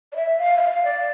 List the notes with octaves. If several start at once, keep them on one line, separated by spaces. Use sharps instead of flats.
D5
E5
F5
E5
F5
D5